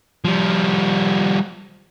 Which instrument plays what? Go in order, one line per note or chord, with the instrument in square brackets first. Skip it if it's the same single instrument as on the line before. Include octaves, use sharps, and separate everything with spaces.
[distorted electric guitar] F3 G3